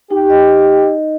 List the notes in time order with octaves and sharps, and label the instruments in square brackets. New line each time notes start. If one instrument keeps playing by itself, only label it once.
[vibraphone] D#4 [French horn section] G4
[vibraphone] D#5